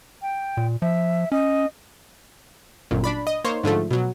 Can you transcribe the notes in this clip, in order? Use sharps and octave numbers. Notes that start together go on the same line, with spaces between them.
G5
A#2
F3 E5
C#4 D#5
G1 F#2 A#2
D4 D5 B5
D#5
A#3 D#4 C5 C#5
G#2 D3 F3 A3
B2 F#3